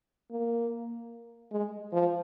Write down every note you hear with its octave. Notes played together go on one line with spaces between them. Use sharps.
A#3
G#3
F3